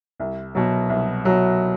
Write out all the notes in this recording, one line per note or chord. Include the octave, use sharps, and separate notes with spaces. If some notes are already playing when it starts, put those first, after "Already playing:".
C2
B2 F#3
C2
B2 F#3